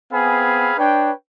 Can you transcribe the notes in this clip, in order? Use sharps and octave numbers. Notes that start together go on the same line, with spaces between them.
B3 C4 G#4 F5 G#5 B5
D4 B4 C#5 G5